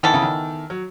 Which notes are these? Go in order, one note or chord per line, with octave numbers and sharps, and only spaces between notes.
D#3 E3 B3 E4 A4
C#3
D#3
F#3